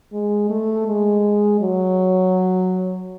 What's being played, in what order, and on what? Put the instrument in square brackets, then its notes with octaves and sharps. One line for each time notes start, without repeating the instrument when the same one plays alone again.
[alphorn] G#3
A3
G#3
F#3